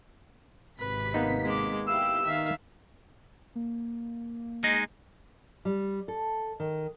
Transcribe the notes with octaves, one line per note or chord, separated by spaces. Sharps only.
G#1 C3 B4 B6
A#3 B3 D#4
G#3 D6
E4 G4 F5 E6
D#3 E5 F5
A#3
G#3 D#4
G3
A4
D#3